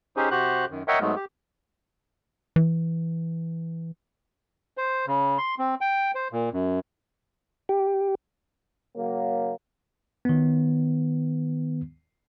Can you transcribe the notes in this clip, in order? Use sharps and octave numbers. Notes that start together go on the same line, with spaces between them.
C#4 D#4 G4 G#4 C5
C3 F#4 G4 C5 F#6
F#2 D#3
A#4 C#5 D#5 E5 F#5 G5
G#2 F#3 G#3 A3 B3
G4
E3
C5
C#3
C6
C4
G5
C5
A#2
F#2
G4
C#3 F#3 A#3
D#3 B3